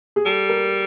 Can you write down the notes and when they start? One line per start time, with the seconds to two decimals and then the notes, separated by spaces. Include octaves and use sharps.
0.16 G#4
0.25 G3 A4
0.49 A#4